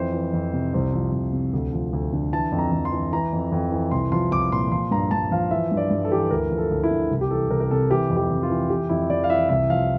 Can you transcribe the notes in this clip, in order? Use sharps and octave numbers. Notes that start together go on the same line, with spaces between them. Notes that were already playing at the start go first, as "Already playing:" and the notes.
Already playing: F2 E3 C5
E3
F2
C3
C2 C5
F3
C2
C3
D2
F3
D2
D3
E3 A5
F2
A#5
F2
C6
E3
E3 A#5
F2
F2
E3
C2 C6
F3 C6
C2 D6
A#2 C6
F3 C6
G2 A#5
G2 A5
F3 F5
E3 E5
G2
D5
G2
A4
E3 G4
A4
D2 A#4
F3
A4
D2
E4
D3
C2
G4
E3 A4
C2 A#4
A#4
C3 A4
E3 G4
F2
G4
F2
F4
E3
E3 G4
F2 E4
F2 D5
F5
E3 E5
C2 E5
F3 F5